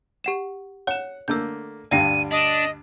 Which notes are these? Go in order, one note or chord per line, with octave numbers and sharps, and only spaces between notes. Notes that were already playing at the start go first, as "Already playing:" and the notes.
G4 F#5 E7
C#5 F#5 E7
D3 A3 A#3 E6 G6
D2 G2 D5 F5 G5 D#7
D4 D#5